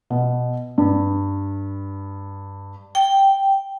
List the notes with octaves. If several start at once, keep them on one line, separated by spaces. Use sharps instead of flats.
B2
G2
G5